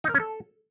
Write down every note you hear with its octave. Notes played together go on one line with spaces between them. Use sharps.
D#4
A#4
C#4
A4